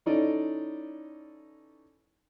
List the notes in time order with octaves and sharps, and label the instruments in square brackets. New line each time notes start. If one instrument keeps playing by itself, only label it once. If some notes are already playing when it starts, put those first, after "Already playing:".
[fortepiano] E3 C#4 D#4 A4 D5 D#5